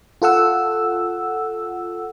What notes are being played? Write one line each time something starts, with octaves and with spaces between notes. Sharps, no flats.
F4 A4 F#5 E6